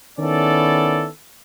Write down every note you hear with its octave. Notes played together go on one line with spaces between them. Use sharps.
D#3 B3 C#4 E4 A4 D5